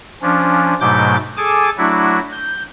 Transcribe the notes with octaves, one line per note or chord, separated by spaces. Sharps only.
F3 C#4 D4
G#2 B2 F#3 A3 D6 G6
G#4 A4 G#5 A5 D6
F#3 A3 D4 E4 F#4
G6